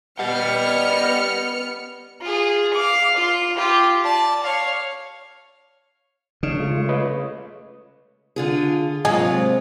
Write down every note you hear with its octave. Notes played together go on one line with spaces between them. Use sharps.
G3 B3 D#5 F#5 F6 C#7
F4 G#4
F5 D6
F4 C6
F4 G4
D5 A5
C#5 F5
C#3 D4 D#4
G#3 A3 F4
B4 C#5 D#5
D3 F4 G#4
C3 F#3 G#3 A#3 F4 G#4 D#5 G#5